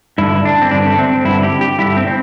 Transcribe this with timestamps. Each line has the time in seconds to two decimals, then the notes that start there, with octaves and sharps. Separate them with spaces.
0.18 G2 D3 E4
0.45 D4
0.62 C4
0.71 G2 D3 D4
0.86 A3
0.98 C4
1.25 G2 D3 E4
1.43 G4
1.61 G4
1.78 G2 D3 E4
1.97 C4
2.07 C4